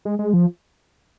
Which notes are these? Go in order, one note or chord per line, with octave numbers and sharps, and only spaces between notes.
G#3
G#3
F3